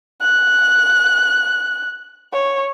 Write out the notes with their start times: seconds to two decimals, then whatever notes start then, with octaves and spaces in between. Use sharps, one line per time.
0.21 F#6
2.33 C#5